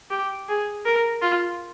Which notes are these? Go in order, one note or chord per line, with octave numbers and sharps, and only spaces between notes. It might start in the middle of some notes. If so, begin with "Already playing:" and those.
G4
G#4
A#4
F4